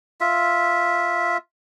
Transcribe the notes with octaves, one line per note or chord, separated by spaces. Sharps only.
F4 E5